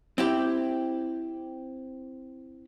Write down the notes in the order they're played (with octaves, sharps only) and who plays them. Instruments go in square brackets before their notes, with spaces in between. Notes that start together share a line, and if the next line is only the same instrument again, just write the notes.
[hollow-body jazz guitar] C4 E4 G4